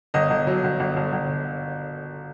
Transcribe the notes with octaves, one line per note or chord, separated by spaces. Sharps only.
G1 D#5
G1
F#3
G1
G1
G1
G1